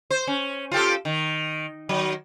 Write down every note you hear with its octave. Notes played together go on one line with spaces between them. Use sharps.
C5
C#4
F4 G4 A4
D#3
D#3 F#3